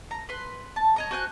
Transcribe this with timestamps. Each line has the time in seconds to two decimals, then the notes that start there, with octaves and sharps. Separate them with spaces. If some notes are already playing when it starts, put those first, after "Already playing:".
0.11 A#5
0.29 B4 C6
0.76 A5
0.96 C#5 D#5 A#5
1.11 F#4 C5 G#5 F#6